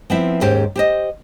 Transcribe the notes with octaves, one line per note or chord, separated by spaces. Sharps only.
F3 B3 C4 E4 E5
D#2 G#2 G#3 C#4 G4 C5
G4 C5 D#5